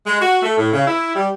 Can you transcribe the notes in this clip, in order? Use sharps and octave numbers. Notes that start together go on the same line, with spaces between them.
G#3
F#4
A3
A2
C#3
E4
G3